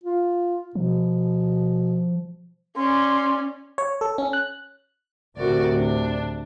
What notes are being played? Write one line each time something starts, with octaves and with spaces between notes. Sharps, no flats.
F4
B2 F3
C#4 D5 C6
C#5
A4
C#4
F#6
D2 A2 C3 F#4 A#4 D5
D4